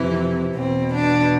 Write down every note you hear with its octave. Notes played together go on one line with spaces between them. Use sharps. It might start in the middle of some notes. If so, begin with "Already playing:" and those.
Already playing: F2 C3 E3 E4
E2 B2 C4
D4